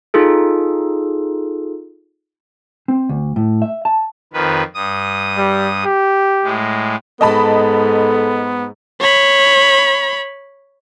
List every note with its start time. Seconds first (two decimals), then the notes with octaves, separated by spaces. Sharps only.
0.14 D#4 F4 G#4 A4
2.88 C4
3.09 D2
3.36 A2
3.62 E5
3.85 A5
4.33 F2 D#3 B4
4.75 G2 D#6
5.38 G3
5.85 G4
6.44 A2 G#3
7.21 G#2 B3 A4 D#5 A5 B5
9.01 C#5 B5